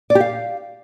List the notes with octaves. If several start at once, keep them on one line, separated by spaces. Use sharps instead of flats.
D5
G4
F5